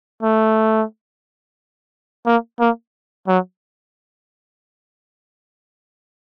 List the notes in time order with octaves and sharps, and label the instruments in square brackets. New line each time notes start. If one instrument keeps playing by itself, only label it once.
[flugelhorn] A3
A#3
A#3
F#3